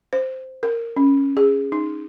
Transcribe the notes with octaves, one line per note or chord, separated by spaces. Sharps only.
C5
A#4
C#4
G#4
D#4